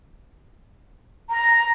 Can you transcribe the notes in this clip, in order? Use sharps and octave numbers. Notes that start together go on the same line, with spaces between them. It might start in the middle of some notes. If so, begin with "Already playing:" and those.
A#5